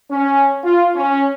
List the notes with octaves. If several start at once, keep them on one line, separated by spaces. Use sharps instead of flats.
C#4
F4
C#4